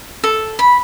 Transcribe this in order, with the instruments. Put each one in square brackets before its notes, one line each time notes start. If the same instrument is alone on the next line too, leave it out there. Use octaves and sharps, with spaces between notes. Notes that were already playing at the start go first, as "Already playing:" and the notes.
[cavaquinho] A4
B5